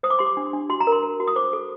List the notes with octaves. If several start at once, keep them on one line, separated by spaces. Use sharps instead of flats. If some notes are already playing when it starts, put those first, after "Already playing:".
C5 D#6
D6
G4 C6
D6
D4
D4
F#4 C6
A#5
A#4
C6
A#4
F#4
D#6
C5 D6
A4